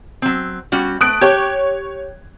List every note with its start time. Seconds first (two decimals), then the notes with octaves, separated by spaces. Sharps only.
0.22 F#3 C4
0.72 G3 C#4 F#4
1.01 A3 D#6 F#6 D7
1.21 G4 C#5 G#6